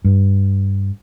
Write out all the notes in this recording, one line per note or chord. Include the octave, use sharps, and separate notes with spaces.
G2